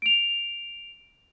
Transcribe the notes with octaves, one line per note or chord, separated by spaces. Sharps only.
D7 F7